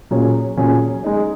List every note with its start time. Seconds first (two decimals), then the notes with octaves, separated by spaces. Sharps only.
0.11 A#2 F#3 C#4 G#4
0.57 A#2 F#3 C#4 G#4
1.03 G#3 D#4 G#4